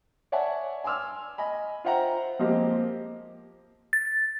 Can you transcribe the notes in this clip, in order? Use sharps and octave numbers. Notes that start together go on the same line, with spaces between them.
C#5 D5 E5 F#5 G#5 A5
G#5 C6 D6 E6 F6
D#5 G#5 B5
F4 C5 E5 F#5 G5 A#5
F3 G#3 A#3 C4 G4 D#5
A6